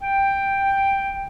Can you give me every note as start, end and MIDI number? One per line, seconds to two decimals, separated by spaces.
0.01 1.27 79